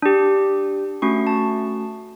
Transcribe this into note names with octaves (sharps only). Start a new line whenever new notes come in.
D4 G4
A3 C#4 F#4 C#6
A5